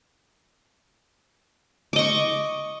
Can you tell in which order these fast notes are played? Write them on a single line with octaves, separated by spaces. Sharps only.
D6 D#5 C#6